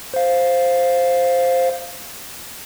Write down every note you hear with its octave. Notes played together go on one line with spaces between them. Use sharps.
C5 F5